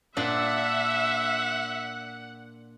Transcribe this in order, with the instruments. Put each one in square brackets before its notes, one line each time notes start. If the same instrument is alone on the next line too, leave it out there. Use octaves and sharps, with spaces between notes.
[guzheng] A#2 D4 [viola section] E5 [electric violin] F#5